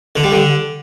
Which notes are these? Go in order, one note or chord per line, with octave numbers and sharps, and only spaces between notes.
D3
G3
D3